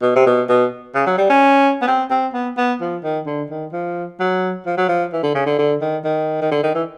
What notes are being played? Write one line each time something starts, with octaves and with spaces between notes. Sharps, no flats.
B2
C3
B2
B2
C#3
F#3
G3
C#4
B3
C4
C4
B3
B3
F3
D#3
D3
D#3
F3
F#3
F3
F#3
F3
E3
D3
C#3
D3
D3
D#3
D#3
D#3
D3
D#3
E3